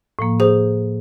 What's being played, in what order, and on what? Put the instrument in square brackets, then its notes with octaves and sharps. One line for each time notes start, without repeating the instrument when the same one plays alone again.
[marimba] A2 F3 A#3
[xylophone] G#4 C5